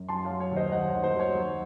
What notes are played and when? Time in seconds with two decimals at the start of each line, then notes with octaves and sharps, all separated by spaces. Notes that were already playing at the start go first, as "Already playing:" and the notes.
Already playing: F#2
0.08 F#3 A5 C6
0.25 C#5 F5
0.30 F#3
0.40 C#5
0.51 D#2
0.56 C5 D#5
0.72 D#2 D#5 F#5
0.88 C#5
0.93 D#2
1.03 C5
1.14 F#3
1.20 C#5
1.35 F#3